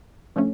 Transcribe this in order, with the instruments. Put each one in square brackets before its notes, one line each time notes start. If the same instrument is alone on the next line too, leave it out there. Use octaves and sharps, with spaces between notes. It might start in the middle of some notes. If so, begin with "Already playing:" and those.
[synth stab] D3 F3 A3 C#4